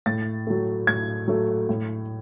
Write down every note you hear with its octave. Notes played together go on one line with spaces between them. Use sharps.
A2 A6
F#3 A3
A2 G#6
F#3 A3
A2